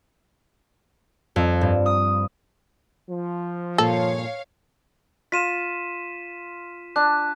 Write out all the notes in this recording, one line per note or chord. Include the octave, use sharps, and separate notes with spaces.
F2
G2
D#6
F3
G2 A#2 A4 C#5 F5
F4 B6 D#7 E7
D4 F#6